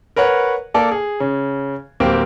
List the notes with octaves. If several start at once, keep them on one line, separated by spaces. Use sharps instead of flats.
A#4 B4 C#5 F#5
A#3 A4 D5
G#4
C#3
D1 A#3 C4 G4